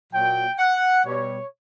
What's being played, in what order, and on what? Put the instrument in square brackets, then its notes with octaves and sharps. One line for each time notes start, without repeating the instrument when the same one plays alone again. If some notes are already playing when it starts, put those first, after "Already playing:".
[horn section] A#2 F#3 G5
F#5
B2 G3 C#5